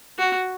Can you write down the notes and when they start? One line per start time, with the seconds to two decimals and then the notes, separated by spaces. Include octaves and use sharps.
0.18 F#4